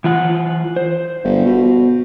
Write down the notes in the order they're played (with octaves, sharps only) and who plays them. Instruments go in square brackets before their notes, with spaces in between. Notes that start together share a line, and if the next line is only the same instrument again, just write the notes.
[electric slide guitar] E3 F4 F#5
C5
[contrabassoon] G1
B2